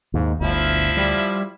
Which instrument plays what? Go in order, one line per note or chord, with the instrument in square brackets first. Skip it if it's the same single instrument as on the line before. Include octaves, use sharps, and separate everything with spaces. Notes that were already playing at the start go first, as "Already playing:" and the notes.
[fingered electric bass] D#2 [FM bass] G#2
[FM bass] G1 [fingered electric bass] D2 [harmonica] F3 E4
[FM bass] G3